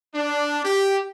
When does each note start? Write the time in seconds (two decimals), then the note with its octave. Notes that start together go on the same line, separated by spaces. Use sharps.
0.15 D4
0.64 G4